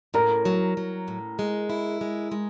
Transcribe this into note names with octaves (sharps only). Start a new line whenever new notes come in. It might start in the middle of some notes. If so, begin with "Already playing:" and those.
A2 A#4 A#5
F#3
F#3
A2
G#3
E4
G#3
G#3